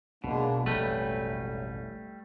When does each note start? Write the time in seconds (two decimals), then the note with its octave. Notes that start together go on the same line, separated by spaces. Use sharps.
0.24 B1 B2 F#3 G#3 A#3 D4
0.66 E1 A1 F2 F#3 G3 A3 B4